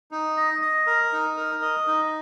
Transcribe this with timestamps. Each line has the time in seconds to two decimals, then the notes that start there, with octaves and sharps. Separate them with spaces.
0.11 D#4
0.37 D#5
0.62 D#5
0.87 A#4
1.12 D#4
1.37 A#4
1.62 D#5
1.87 D#4